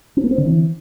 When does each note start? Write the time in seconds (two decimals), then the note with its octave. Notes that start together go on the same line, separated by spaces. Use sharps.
0.17 C4
0.24 A#3
0.31 C4
0.38 D3
0.45 E3